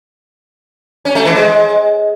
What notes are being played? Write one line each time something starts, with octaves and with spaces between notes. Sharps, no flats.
C#4
A3
E3
G#3